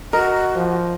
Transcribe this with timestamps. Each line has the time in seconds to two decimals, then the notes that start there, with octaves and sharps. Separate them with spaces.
0.13 F#4 A#4 D#5
0.55 F3